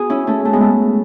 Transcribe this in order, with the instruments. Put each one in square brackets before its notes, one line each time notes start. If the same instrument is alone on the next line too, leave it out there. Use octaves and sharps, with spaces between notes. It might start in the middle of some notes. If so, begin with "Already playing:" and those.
Already playing: [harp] B3 F#4 G#4
C#4 E4
A3 C#4
A3
G#3 B3
A3